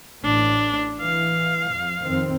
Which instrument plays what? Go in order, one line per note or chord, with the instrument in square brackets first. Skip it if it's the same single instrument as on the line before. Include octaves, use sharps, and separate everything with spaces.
[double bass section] A1 A2 [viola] D4
[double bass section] E3 [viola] F5
[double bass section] F2
F2 D#3 C4